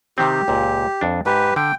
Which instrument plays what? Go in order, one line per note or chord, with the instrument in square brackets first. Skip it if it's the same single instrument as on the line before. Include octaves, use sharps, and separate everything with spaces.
[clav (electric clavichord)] C3 D#3 C4 [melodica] G4
[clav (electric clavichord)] C#2 A#2
F2 D4
[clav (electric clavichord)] G#2 [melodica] G4 B4
[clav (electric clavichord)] D3 [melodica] G5